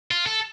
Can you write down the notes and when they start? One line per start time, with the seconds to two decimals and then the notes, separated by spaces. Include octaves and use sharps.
0.11 F4
0.26 A4